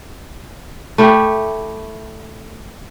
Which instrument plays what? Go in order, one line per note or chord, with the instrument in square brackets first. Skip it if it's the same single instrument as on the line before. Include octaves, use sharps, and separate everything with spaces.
[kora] A3 E4 G4